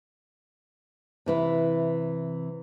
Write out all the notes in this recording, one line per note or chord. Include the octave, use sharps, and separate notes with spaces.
C3 E3 E4